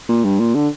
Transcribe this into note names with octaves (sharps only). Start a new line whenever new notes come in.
A#2
G2
A#2
D3